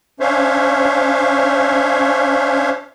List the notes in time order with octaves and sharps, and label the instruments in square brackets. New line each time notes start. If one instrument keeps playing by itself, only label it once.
[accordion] C#4 D4 C5 C#5 E5 F5